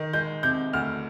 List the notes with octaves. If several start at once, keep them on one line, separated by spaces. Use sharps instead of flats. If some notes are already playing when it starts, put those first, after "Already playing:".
Already playing: D#3
G#3 G6
C3 G6
D2 F6